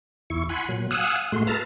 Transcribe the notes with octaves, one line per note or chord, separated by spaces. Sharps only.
E2 E4 C#6
F#5 G#5 B5 C6
A#2 F#3
F5 F#5 G#5 D#6 E6 F#6
A2 G#3 A3 F#4 C6
A4 B4 F5 A5 A#5